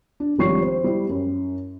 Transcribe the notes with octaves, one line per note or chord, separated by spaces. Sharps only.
D4
G#1 F3 G3 C#5 C#6 C7
C5
G3 E4
F#2